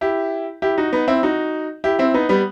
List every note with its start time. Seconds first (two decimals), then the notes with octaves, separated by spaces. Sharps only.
0.01 E4 G4
0.62 E4 G4
0.77 D#4 F#4
0.93 B3 D#4
1.08 C4 E4
1.23 D#4 F#4
1.84 E4 G4
1.99 C4 E4
2.14 B3 D#4
2.29 G3 B3